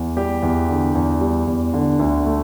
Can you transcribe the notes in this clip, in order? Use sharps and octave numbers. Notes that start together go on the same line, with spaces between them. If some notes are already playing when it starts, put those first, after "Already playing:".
Already playing: E2
G3 G4
E2
D3
E2
G3
E2
D3
D2
A3